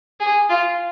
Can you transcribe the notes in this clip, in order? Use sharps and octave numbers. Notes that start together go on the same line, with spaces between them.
G#4
F4